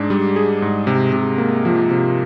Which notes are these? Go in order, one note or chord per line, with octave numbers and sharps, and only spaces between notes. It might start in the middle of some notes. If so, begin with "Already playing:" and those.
Already playing: G#2 D4 G#4
G3
G#4
G#2
C3
C3
A#3
F3
C3